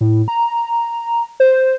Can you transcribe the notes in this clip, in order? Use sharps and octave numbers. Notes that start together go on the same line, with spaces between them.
A2
A#5
C5